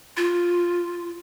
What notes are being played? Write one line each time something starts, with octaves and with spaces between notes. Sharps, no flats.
F4